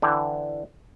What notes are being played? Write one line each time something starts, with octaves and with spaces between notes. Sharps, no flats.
D3 E3 G5